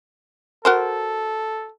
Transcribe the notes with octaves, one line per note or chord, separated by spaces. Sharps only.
F#4 A4 A#4 C5